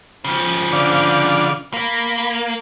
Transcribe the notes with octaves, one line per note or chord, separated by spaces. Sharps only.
C#3 F3
D3 D5 F5
A#3 B5